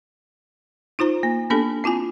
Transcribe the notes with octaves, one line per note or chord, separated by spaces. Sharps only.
D#4 F4 C5 A#5
A#3
A#3 B3 D4 G4 A4
C4 E4 F4 G#5